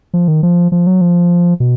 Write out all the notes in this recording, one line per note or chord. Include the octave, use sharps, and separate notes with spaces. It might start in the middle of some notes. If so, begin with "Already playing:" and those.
F3
D#3
F3
F3
F#3
F3
B2